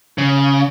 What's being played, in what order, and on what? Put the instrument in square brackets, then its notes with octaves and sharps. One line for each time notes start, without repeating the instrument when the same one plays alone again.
[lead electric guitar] C#3